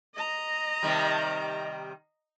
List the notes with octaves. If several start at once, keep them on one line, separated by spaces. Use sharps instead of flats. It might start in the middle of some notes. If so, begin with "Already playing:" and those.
D#5 A#5
C3 D#3 G3